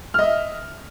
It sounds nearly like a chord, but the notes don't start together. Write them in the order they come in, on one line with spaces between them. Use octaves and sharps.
F6 D#5 E5